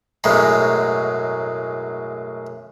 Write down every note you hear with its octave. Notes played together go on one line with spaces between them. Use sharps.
B1 F#2 A2 G#3